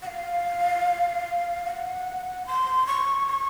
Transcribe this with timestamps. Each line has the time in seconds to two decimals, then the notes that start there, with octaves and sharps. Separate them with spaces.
0.02 F#5
0.07 F5
1.65 F#5
2.46 C6
2.87 C#6
3.27 C#6